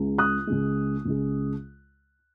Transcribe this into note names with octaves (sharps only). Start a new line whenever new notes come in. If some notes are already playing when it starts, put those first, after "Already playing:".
Already playing: C#2 C#3 G#3
D#6 F#6
C#2 C#3 G#3
C#2 C#3 G#3